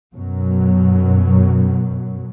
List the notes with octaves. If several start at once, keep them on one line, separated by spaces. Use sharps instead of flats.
F#2 B2 F#3